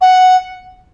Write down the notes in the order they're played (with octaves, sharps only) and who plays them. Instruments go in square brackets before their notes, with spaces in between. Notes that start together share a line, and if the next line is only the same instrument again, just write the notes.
[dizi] F#5